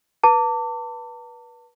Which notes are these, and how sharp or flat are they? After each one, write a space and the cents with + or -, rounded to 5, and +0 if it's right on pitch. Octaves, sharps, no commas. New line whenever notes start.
B4 -20 A5 +40 D6 -20